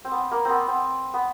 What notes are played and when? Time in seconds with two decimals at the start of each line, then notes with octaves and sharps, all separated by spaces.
0.05 C4
0.12 B3
0.31 A#3
0.45 B3 C4
0.68 C4
1.14 B3